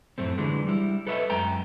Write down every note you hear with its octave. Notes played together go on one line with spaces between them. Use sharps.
F#2 A2 A3 C4
D3 E3 F#3 G#3
G3 E4
A4 B4 C#5 D#5 E5
F#2 G#3 G5 A#5